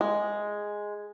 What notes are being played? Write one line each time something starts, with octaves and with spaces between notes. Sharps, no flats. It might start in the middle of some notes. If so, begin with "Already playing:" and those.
G#3